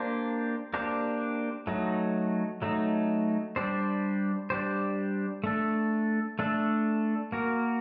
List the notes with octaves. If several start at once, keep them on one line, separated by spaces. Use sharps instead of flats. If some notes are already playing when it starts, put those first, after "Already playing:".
Already playing: A#3 D4 G4 C5
A#3 D4 G4 C5
F#3 A3 D#4
F#3 A3 D#4
G3 D4 G4 C5
G3 D4 G4 C5
A3 D4 A4
A3 D4 A4
A#3 F#4 A#4